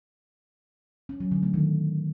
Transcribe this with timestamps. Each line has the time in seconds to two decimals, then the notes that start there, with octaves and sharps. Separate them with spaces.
1.09 C#4
1.20 F#3
1.31 D3
1.43 A3
1.54 D#3